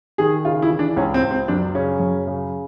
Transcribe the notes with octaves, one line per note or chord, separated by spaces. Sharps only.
D#3 G#4
C#3 F4
E4
E3
D4
C#2 C#4
C4
C#2
C4
F#2 D4
C#3 C#4
F#2
C#3